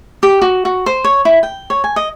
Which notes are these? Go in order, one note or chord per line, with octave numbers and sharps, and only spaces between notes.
G4
F#4
F#4
C5
C#5
E4
G5
C#5
G#5
D#5